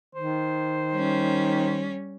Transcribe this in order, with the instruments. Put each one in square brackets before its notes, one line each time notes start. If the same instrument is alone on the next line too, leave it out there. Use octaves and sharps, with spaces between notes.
[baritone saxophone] D#3 [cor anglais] C5
[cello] G3 C#4